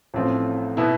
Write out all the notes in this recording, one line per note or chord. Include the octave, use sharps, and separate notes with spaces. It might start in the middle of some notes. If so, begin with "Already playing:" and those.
A1 A2 F3 C4 F4
B2 B3 E4